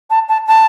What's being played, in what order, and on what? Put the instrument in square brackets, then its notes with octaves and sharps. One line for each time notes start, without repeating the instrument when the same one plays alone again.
[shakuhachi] A5
A5
A5